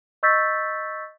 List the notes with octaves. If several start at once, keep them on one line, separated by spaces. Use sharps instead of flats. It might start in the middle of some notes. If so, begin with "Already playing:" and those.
D#5 C#6 E6 G6 A6 B6